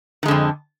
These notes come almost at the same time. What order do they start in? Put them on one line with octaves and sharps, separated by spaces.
D#3 G#3 D3 F2